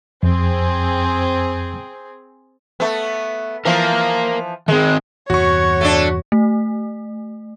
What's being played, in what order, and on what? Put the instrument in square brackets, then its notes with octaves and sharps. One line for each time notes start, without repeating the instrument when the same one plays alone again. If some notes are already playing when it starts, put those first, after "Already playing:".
[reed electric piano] F2 [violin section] C4 G#4
[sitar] A3 B3
[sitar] E3 F3 [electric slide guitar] A#4 F5
[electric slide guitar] D#3 C4 [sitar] G#3
[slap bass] E2 G2 C3 [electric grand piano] F#4 C#6 [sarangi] C#5
[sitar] A3 D4
[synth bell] A3